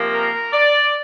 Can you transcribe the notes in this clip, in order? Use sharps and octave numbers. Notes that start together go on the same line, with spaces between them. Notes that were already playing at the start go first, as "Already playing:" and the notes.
Already playing: C3 F3 A#3 F4
A#4
D5